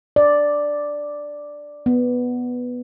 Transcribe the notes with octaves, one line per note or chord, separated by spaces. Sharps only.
D5
B3